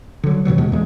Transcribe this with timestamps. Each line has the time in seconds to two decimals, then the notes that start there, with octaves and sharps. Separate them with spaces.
0.23 D3 F#3
0.45 G#2 C3 E3 F#3
0.58 D#2 B2 G#3
0.72 E2 G#3